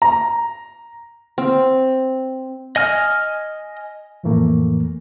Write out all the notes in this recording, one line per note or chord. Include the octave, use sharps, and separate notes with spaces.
A#5
C4
D#5 G#5 F6
F2 A2 E3 A3 A#3